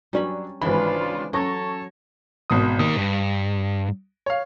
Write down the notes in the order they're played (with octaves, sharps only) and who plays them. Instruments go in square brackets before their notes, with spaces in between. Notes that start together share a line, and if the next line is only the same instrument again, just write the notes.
[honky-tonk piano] F#3 D4 [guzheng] G3 C#4 B5
[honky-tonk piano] G#1 B5 [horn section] C#3 D4 F4 [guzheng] E3
[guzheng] F#3 [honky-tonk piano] C#4 C#6 A#6 [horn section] A4 C#5 A5
[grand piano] G#1 B2 D#6
[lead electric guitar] D#3 A#3 [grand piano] D#6
[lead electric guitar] G2
[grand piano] C#5 F5